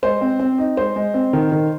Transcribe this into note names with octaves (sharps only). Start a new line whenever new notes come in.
G#3 C5
C4
C4
D#4
G#3 C5
G#3
C4
D#3
D#3